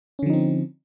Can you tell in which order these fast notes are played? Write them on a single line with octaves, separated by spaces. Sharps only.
C#4 D3 F3 D#4 C4